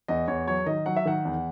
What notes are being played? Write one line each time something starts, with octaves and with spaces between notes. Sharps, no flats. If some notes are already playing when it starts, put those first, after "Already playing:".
E2 D#5
E2 C#5
F#3 C#5
D#3 D#5
F#3 F#5
E5
D#3 F#5
E2